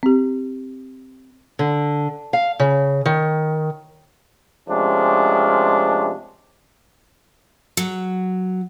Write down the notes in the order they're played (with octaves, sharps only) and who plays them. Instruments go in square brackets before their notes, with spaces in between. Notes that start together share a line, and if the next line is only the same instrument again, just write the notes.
[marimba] C4 G4
[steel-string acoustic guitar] D3
F5
C#3
D#3
[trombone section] C3 F3 G#3 A3 C#4 D4
[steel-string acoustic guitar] F#3